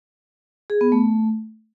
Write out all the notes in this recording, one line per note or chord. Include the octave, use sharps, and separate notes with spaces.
G#4
B3
A3